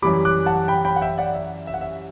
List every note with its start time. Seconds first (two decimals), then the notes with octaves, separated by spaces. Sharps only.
0.02 F#2 E3 G3 B5 D6
0.25 D6 F#6
0.46 F#5 A5
0.68 G5 B5
0.85 G5 B5
0.96 F#5
1.02 E5 G5
1.18 D5 F#5
1.35 E5
1.67 E5
1.74 F#5
1.81 E5